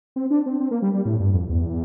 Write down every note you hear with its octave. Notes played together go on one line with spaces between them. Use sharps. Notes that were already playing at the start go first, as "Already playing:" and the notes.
C4
D4
C4
C4
A#3
G3
G3
A2
G2
F2
E2